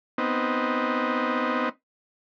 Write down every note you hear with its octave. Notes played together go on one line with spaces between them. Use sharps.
B3 C4 D#4